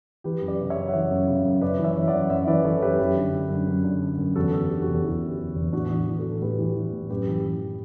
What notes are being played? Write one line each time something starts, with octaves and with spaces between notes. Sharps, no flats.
E3 G4 B4
F#2
B4 D5
C#3
C#5 E5
F#2
F#5
E3 C#5 E5
F#2
C#3
F#2
F#2 B4 D5
E3
C#5 E5
E3
D5 F#5
F#2
F#2 C#5 E5
E3 B4 D5
E3 A4 C#5
F#2 G4 B4
F#2
D3
D3
F#2
F#2
D3
D3
F#2
E2 F#4 A4
D3 F#4
D3 G4
F#4 A4
E2
E2 E4 G4
D3
D3
E2
A2 D4 F#4
E3
E3
F#4 A4
A2
A2 G4 B4
E3
E3
A2
F#2 G4 B4
E3
E3